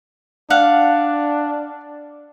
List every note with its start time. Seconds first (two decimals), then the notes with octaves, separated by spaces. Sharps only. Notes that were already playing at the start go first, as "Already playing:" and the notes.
0.50 D4 F5 F#5